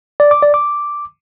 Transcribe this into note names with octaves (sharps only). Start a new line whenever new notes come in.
D5
D6
D5
D6